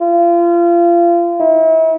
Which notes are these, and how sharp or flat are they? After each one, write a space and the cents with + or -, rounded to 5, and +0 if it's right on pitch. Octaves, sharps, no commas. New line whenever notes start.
F4 -30
E4 -40